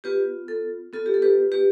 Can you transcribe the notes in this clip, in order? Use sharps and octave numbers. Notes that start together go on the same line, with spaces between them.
B3 F4 G4 B4
A4
B3 F4 A4
G4
A4
G4 B4
G4 B4